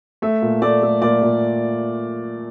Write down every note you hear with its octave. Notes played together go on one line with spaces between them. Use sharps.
A3 E5
A#2
A3 D5
A3
A#2 D5
A#2